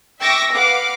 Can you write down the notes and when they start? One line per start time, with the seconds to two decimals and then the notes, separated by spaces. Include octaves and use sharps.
0.20 E5 G5 C#6 D6 E6 A#6
0.51 B4 F5 F#5 D6